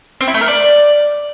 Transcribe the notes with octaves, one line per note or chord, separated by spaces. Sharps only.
C4
E4
A3
A#4
D5